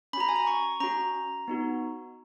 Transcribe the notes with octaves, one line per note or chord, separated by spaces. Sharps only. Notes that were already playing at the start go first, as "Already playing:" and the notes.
C#4 F#4 A#5 B5
G#5
A#5
C#6
C#4 F#4 A#5
B3 D#4 F#4